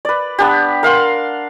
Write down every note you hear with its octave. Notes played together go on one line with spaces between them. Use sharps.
B4 D5
B3 D4 G4
A#4 F5 F#5 C6